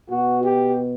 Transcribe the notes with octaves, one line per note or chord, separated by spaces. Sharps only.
B2 F#4
G4